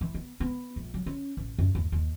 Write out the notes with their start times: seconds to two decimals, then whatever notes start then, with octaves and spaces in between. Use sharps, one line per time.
0.01 E3
0.14 B3
0.40 B3
0.76 A#1
0.94 F#3
1.06 C#4
1.37 A1
1.58 F#2
1.75 D#2
1.92 D#2